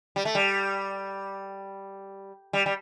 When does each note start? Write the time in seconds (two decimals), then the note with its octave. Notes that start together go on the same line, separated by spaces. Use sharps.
0.16 G3
0.25 A3
0.35 G3
2.53 G3
2.66 G3